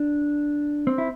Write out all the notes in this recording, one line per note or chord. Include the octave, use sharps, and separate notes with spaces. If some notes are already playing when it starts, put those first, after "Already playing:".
Already playing: D4
C4
E4